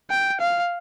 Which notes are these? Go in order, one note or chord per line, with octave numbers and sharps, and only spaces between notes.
G5
F5